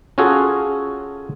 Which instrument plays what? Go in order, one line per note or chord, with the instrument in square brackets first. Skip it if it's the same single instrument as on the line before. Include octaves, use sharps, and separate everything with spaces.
[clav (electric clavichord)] C#4 F4 F#4 G#4 A4